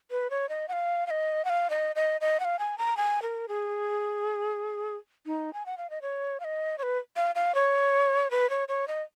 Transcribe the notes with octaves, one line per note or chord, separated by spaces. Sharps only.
B4
C#5
D#5
F#5
F5
F5
D#5
F#5
F5
D#5
D#5
D#5
F#5
F5
G#5
A#5
G#5
A#4
G#4
D#4
G#5
F#5
F5
D#5
C#5
F5
D#5
C#5
B4
F5
F5
C#5
B4
C#5
C#5
D#5